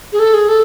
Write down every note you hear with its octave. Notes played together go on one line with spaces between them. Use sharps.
G#4
A4
G#4
A4